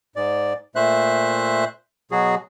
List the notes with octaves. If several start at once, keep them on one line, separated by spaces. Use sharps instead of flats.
G#2 D5
A#2 A3 C5 E5 F#6
B2 F#3 F#4 G#4